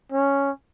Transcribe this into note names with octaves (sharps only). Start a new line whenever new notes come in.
C#4